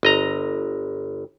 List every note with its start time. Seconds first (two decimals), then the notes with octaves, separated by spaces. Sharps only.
0.03 G1 D#5 A#5